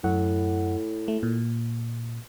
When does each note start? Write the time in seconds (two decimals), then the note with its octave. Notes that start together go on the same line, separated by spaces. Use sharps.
0.04 F#2 A2 F#5
1.08 A3
1.23 A#2